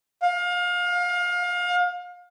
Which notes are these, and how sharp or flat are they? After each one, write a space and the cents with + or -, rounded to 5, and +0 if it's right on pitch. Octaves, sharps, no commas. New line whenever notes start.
F5 +30